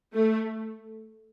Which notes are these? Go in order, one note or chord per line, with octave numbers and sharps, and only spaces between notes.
A3